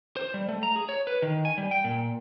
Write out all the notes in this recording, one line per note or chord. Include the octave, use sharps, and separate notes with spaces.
C5
G3
A3
A#5
G#4
C#5
B4
D#3
G#5
G3
G5
A#2